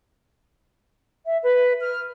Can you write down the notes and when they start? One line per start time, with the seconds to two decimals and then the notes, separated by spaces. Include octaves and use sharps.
1.26 E5
1.43 B4
1.81 F6